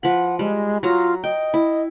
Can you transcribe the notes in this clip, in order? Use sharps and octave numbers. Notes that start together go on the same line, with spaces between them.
F3 F#5 B5
G3 G#3
F#3 F4 A#5
D#5 G5
E4